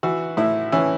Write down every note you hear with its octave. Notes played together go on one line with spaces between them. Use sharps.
E3 F#4
A2 E4
E3 C#4